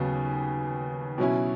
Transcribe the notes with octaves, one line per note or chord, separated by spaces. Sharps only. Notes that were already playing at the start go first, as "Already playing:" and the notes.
Already playing: D#2 C#3 F#3 B3
B2 F#3 C#4 E4